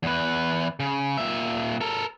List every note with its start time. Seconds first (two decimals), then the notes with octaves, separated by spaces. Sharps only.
0.03 E2 B4
0.80 C#3
1.18 A#2 E5
1.81 A4 A#4